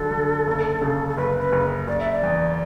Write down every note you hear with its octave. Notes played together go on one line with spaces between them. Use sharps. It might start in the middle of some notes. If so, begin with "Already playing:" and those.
Already playing: F#1 D3 F#3 A4
D3
F#1
C#3
A4
F#1 B4
B4
F#1
F#1 D5
E5
D5
E2